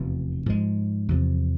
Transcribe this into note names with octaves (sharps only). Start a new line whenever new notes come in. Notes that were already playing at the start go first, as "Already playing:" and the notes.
Already playing: F1 E2 B2
G#2 F3 G#3
E2 C3 F3